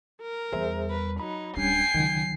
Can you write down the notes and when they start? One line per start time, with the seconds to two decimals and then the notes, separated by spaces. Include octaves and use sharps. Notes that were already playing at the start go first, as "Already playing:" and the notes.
0.22 A#4
0.52 E2 G3 G#4 C5 E5
0.90 B4
1.20 F#3 D#4 B5
1.57 D1 G3 C#4 D4 G5 G#5 C7
1.94 C#2 D#3 F#3